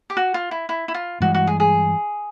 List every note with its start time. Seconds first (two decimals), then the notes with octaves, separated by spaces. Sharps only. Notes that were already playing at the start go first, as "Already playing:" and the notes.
0.10 G4
0.17 F#4
0.34 F4
0.51 E4
0.69 E4
0.88 E4
0.94 F4
1.20 G2 E3 G#3 F#4
1.34 F#4
1.47 G#4
1.60 G#4